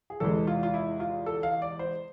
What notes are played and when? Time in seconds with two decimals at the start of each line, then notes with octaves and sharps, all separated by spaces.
0.10 G#4
0.20 E2 C3 E3 G#3 A4
0.47 F4
0.63 F4
0.74 E4
1.00 F4
1.26 A4
1.43 F5
1.62 D5
1.79 C5